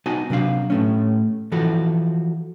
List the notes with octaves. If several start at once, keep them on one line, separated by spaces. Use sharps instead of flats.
B3 D#4 F#4 D#5 G#5 A5
C3 F#3 D4 F5
A2 A3 C#4
E3 F3 F#4 A4